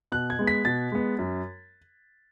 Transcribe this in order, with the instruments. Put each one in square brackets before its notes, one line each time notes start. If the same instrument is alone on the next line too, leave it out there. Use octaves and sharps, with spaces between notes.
[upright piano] B2 F#6
G#6
G#3 B3
B6
B2 A6
G#3 B3
F#2